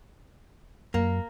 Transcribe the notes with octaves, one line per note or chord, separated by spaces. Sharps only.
F#2 A#3